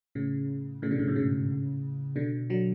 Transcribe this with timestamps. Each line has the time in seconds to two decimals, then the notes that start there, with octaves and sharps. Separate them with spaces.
0.15 A2 C#3
0.82 A2 C#3
0.91 B2 D3
0.99 A2 C#3
1.08 G#2 B2
1.16 A2 C#3
2.16 B2 D3
2.50 D3 F#3